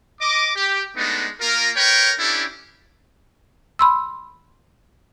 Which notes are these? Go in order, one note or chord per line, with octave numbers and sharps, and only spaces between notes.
D#5 D6
G4
G#3 A3 B3 D4 D#4
A#3 F4 A#4
A#4 B4 C#5 G5
C#4 D4 E4 G4 A4
B5 C6 E6